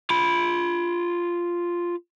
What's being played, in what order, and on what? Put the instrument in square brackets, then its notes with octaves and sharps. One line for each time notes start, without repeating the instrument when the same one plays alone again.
[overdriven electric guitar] F4 B5